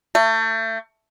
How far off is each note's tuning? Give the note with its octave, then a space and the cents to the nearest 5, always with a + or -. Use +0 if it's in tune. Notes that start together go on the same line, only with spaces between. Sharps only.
A3 +30